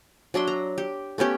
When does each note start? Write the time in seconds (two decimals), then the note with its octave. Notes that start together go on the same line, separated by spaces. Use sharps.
0.34 F#3 D4 E5 C6
0.47 A#5
0.78 G4
1.18 A3 B3 C#4 G4